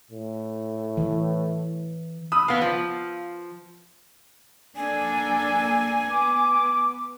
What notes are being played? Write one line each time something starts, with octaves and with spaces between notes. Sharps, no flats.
A2
E3
B5 D#6 E6
E3 B3 F5
F3
A#3 D4 A4 G#5
B3 D6